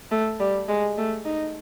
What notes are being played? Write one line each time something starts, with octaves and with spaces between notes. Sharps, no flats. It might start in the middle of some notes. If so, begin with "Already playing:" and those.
A3
G3
G#3
A3
D#4